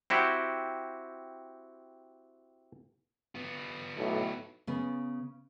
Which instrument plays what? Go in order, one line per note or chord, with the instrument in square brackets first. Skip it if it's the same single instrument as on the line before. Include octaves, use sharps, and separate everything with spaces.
[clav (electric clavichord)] C4 E4 F#4 G4
[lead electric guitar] B3 F4
[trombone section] B1 A2
[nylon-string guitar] C#3 B3